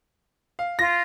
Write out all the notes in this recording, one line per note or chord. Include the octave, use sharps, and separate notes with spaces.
F5
F4 A#6